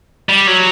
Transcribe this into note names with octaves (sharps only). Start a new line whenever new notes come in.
G3
F#3